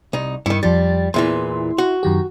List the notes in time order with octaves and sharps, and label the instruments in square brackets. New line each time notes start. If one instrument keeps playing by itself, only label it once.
[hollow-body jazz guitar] C2 D#4
[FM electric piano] G2 C#7 [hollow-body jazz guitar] D#3 E4
[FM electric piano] F2 F3 A6 [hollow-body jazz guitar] G3
[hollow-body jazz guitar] E2 A#2 E3 [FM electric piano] E4 E5 C6
[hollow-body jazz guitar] F#4
[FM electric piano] F#2 D#3 G4